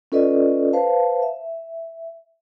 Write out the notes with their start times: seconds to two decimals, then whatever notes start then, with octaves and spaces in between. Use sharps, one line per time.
0.12 C#4 F4 A4 B4 D5 D#5
0.73 B4 C5 F5 A5
1.22 E5